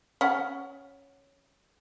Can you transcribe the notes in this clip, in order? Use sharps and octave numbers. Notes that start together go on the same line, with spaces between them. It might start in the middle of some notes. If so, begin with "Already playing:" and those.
C#4 F#5